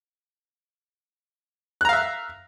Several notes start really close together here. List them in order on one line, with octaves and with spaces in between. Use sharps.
F#6 A#5 F5 E5